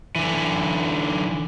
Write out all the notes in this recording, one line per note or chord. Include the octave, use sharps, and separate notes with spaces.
D3 E3